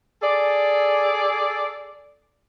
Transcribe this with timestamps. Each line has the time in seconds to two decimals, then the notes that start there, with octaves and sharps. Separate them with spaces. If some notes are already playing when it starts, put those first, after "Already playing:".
0.22 G#4 A4 D5